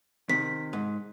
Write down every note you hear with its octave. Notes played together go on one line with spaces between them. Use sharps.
C3 D#3 B6
G#2